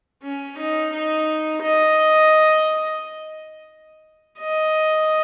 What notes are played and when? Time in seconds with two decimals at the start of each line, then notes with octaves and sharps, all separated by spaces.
0.23 C#4
0.58 D#4
0.92 D#4
1.62 D#5
4.40 D#5